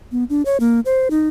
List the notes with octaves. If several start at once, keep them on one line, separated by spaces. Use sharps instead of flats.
B3
D4
C#5
A#3
C5
D#4